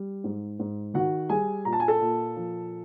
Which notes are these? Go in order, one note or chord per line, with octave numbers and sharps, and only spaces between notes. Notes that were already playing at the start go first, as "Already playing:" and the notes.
Already playing: G3
G#2
G#2
D#3 F#4 F#5
G3 G#4 G#5
A#2 A#5
A5
G#5
A4 A5
A#2
F3